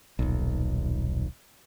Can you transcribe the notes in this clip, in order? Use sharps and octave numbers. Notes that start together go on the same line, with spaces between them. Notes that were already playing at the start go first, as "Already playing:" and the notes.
D#1 B1